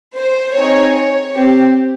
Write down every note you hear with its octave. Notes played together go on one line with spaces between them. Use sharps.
C5
C4 D#4 G#4 C#5
C#5
C4 G4